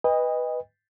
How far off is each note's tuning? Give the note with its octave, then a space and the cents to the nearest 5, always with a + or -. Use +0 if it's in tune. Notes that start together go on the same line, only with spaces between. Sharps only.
B4 +0 D#5 +0 G5 +45